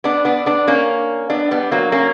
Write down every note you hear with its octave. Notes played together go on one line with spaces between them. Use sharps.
B3 D4
B3 D4
B3 D4
A#3 C#4
B3 D4
G3 B3
F#3 A#3
A#3 C#4